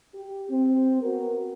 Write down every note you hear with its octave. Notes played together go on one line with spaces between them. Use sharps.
G4
C4
B3 F#4 A#4